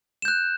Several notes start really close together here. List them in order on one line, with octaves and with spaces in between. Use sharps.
E7 G6 F#6